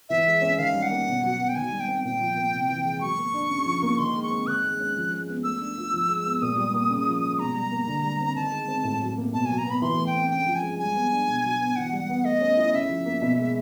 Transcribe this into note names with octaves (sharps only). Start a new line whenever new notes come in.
E3 E5
G#3
C#4
D#3 F5
G3
F#5
A#3
B2
F#3
B3
G5
D#3 G#5
G3
G5
C4
A#2 G5
F3
A#3
C3
E3
G#3
F#3 C#6
A#3
D4
C#3
F3
A#3
D#3 C6
G#3
C#6
C4
D#3 F#6
G#3
C#4
F3
G#3
B3
A3 E6
D4
F4
F3
G#3
B3
A#2 D#6
G3
A#3
C#3
F3
G#3
B2 A#5
G3
A#3
D3
G3
C4
D#3 A5
G#3
C4
A2
F#3
A#3
B2 A5
F#3 G#5
A#5
B3 B5
E3 C6
A3
G5
C4
C#3 G5
F3
G#5
G#3
G3 G#5
B3
D4
B2
F#3
B3
E3 F#5
G3
B3
A3 D#5
C#4
E4
C#3 E5
F3
A#3
B2
G#3